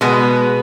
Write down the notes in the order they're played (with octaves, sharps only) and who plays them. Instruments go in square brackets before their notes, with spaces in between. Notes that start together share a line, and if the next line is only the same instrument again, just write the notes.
[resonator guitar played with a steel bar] B2 G#3 B3